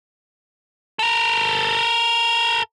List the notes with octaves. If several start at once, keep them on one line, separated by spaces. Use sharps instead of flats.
A4 A#4